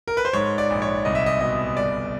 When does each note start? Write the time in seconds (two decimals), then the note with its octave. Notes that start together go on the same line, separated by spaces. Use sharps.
0.08 A#4
0.17 B4
0.25 C5
0.33 G#2 C#5
0.58 D5
0.70 A#1
0.82 C#5
1.05 C2 D#5
1.15 E5
1.26 D#5
1.40 B2 D#5
1.77 G1 D5